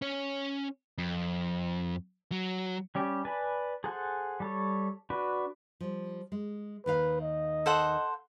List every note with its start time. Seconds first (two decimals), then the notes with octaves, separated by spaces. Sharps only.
0.02 C#4 C#5
0.98 F2
2.32 F#3
2.95 G3 C#4 G4
3.25 B4 D5 G#5 A5 B5
3.84 G#4 A4 C5 F#5 G#5
4.40 G3 A4 C#5
5.10 D4 F#4 B4
5.81 F3 G3
6.32 G#3
6.86 D#2 D#3 B4 F5
7.22 D#5
7.66 A4 C5 F#5